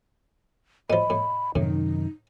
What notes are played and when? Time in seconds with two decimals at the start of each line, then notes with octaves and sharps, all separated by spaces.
0.90 A2 F3 D#5 B5
1.10 A2
1.55 F#2 A2 C3 D#3 D#4